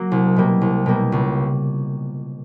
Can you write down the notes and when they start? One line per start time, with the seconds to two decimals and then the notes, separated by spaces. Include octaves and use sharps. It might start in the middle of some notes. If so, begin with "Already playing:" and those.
Already playing: F#3 A#3
0.12 C2
0.36 B2 G3 A#3
0.61 C2
0.86 B2 G3 A#3
1.12 C#2